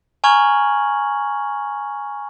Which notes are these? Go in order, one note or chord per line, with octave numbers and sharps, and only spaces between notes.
G#5 A#5 C#6 F6 G#6 F#7